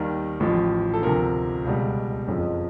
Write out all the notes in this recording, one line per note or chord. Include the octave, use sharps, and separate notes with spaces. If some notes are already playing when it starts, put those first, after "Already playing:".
Already playing: D#2 D#3 G3 A#4
A1 A2 F3
A4
D2 C3 F3 A#4
C#2 B2 G3
F#1 F2 C#3 F3